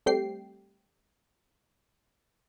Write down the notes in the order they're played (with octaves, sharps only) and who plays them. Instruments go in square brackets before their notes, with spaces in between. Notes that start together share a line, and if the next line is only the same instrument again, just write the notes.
[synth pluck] G3 A3 C4 G4 G5 C7